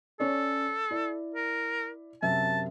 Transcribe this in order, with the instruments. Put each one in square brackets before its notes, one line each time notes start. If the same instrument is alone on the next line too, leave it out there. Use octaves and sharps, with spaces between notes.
[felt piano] C#4 C#5 D5 [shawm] A4
[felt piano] E4 D5
[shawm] A#4
[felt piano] F#2 C3 E5 [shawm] A5